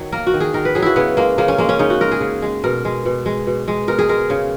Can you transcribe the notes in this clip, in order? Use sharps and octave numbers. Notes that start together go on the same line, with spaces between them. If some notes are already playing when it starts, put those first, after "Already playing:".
Already playing: D#3 F#3
A#3 A#4
F#4
D#3
G#4
D#3 A#4
B4
F#3 G#4
E4 F#4
C#3 B3
G#3 A#3
C#3 A#3
C#4
G#3 A#3
C#4
C#3 D#4
F#4
G#3 A#4
G#4
C#3
G#3
B2 A#4
G#3
B2
G#3
B2
G#3
B2 A#4
G#4
G#3 A#4
C#3